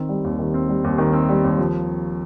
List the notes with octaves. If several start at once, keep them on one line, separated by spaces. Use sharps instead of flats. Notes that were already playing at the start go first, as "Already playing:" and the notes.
Already playing: D#3 C4
G3
D#2
D#3
C4
G3
D#2
D#3
C4
G3
D#2
F3